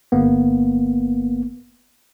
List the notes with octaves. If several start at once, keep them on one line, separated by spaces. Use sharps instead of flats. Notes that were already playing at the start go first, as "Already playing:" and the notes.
G1 A#3 B3